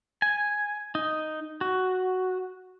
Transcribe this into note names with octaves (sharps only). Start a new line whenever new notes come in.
G#5
D#4
F#4